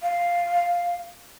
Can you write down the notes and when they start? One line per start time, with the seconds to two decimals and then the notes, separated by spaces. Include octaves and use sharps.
0.02 F5